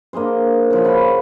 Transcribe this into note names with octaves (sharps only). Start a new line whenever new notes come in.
A#3 D4 G#4 C5
C#3 F3
F#4 F5 F#5 B5